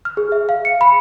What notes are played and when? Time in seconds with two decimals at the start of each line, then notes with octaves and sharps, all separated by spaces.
0.05 F6
0.17 G#4
0.32 E5
0.49 F5
0.65 C#7
0.81 B5